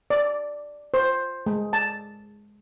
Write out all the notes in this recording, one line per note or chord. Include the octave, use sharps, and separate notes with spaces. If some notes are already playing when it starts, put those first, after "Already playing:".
D5
C5
G#3
A5